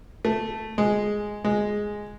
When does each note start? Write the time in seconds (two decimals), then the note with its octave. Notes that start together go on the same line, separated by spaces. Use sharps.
0.25 A3
0.78 G#3
1.45 G#3